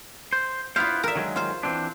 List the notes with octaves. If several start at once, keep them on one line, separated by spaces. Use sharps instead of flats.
C5
B3 E4 F4 C5 F5
A#4 E5
D#3 F#3 G#3
F4 C5
E3 C4 D4